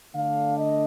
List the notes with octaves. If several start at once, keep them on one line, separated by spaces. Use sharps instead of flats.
D3 A3 D4 F5
D#5